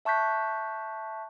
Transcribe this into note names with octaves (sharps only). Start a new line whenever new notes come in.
E5 A5 C#6 F#6 G6 B6